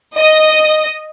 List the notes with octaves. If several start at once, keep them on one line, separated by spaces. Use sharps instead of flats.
D#5